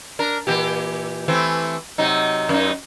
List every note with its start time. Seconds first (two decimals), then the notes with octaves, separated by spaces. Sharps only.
0.19 D4 A#4
0.47 A#2 E3 G4
1.28 E3 A3 C4
1.98 C3 F#3 D#4
2.49 F#2 D#4